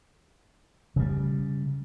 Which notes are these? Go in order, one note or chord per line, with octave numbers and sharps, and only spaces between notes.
C#3 G3